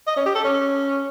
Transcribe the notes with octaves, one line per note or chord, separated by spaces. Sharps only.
D#5
C#4
G4
A4
C#4